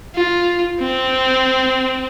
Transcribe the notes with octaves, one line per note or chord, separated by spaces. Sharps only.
F4
C4